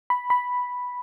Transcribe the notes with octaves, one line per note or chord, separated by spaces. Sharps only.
B5
B5